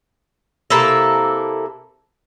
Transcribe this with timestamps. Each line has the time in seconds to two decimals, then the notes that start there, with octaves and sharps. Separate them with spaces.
0.70 C3 A#3 E4 A4